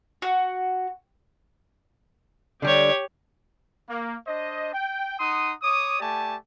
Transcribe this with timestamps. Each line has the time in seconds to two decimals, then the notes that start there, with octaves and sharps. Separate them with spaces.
0.22 F#4
2.62 D3 G3 G4 C#5
3.89 A#3
4.27 D4 C5 D#5
4.74 G5
5.19 D#4 F#5 C6 D#6
5.62 C#5 D6 D#6
5.99 A3 G4 D5 G#5 A5